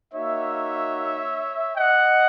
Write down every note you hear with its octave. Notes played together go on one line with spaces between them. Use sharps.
A#3 D#4 F#4 C#5 E5
D#5 F#5